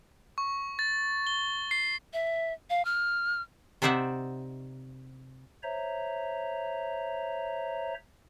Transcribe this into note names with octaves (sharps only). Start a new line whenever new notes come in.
C#6
A6
G7
C7
E5
F5
F6
C3 D#4 C5 D5 E5 F#5
C5 C#5 E5 A#5